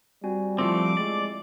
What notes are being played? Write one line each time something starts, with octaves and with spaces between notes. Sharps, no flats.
G3 C4 F#4 G#5
F3 A3 C4 E4 F4 D6
G#3 D5